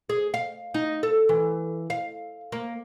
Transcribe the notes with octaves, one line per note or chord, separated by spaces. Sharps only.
G#4
F5
D#4
A4
E3
F5
A#3